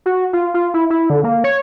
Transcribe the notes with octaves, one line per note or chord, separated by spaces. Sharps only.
F#4
F4
F4
E4
E4
D3
A#3
C#5